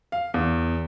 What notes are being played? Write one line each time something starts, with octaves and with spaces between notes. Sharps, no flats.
F5
E2